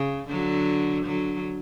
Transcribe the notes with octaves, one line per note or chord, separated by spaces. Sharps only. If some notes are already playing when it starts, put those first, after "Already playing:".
Already playing: C#3
D3 F#3
D3 F#3